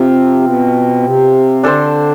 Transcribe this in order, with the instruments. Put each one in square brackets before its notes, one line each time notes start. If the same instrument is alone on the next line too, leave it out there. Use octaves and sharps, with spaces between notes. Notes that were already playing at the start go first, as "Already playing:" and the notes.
Already playing: [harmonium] C3 [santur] C4 F4
[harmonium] B2
C3
[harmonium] D3 [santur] D4 A4 C5